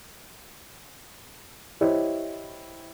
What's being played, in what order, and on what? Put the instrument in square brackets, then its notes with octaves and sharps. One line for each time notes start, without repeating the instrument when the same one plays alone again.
[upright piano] E4 G4 C5 C#5 D#5